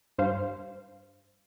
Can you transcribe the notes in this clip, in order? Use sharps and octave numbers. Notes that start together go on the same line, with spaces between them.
G2 C5 F5